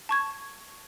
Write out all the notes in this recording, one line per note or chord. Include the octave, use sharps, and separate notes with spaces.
A5 C#6 G#6